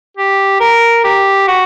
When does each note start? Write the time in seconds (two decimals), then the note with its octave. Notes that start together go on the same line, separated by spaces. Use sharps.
0.17 G4
0.60 A#4
1.04 G4
1.48 F#4